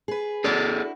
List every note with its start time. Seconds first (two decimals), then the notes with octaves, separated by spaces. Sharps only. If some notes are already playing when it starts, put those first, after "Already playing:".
0.08 G#4 B4
0.44 D4 E4 F#4 G#4 A4 D5